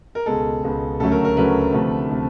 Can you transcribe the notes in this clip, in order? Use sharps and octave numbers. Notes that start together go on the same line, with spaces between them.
A#4
C#2 B2 G#3 A4
C#2 B2 G#3
D2 C#3 F#3 A3 C#4 A4
A#4
A#4
D2 C#3 F#3 A3 C#4 B4
D2 C3 F3 A3
C3 F3 A3